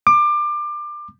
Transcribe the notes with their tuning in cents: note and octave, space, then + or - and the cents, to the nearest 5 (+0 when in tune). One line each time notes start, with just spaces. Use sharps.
D6 +25